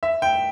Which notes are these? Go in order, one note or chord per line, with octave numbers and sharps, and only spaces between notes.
E5
G5